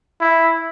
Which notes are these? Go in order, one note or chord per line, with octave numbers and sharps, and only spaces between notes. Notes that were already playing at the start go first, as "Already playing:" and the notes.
E4